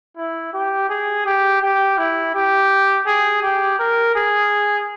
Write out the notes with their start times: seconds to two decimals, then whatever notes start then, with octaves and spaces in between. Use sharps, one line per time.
0.17 E4
0.53 G4
0.89 G#4
1.25 G4
1.62 G4
1.98 E4
2.34 G4
3.07 G#4
3.43 G4
3.79 A#4
4.15 G#4